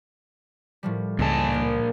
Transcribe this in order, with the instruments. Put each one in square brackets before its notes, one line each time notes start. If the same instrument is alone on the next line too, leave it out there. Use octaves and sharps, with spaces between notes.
[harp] A2 F3 G3
[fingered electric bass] C#2 [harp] G2 D#5 G#5 [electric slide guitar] A#2 A5
[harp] G#3 A#3 D4